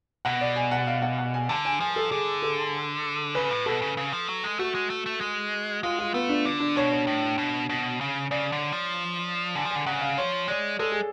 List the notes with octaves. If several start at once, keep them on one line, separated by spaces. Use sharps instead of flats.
B2 F#5
D5
G#5
F#5
F5
F#5
F#5
G#5
D3 A5
G#5
F3 G#5
A4
D3 G#4
A4
C#3 B4
A2
B2 A4
C#3
C#3
F3
F#3
G#3
A3 F#4
G#3
A3
A3
G#3
G#3 F4
F4
A3 B3
D4
D3 D4
D4
B2 C#5
C#5
A2
B2
B2
C#3
C#3 D5
D3
F3
D3 G#5
F3
D3 G#5
C#3 F#5
F5
F3 C#5
G#3 D5
G#3 A4
G#4